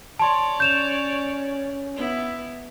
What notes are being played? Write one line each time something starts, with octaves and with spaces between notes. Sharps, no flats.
C#5 D5 A5 C6
C#4 G6 E7 F7
B3 E4